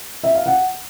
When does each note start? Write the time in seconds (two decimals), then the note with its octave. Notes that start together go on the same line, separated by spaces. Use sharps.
0.24 E5
0.35 F5
0.46 F#5